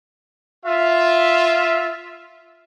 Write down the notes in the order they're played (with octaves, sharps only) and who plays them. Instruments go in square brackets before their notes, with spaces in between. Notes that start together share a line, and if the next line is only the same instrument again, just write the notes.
[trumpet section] F4 E5